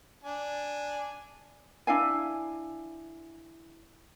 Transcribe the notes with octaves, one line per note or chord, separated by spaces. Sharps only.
D4 G#5
D4 E4 F5 G#5